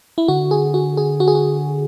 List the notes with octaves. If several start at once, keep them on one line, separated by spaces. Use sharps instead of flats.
E4
D3 F#4
G#4
F#4
G#4
F#4
G#4
F#4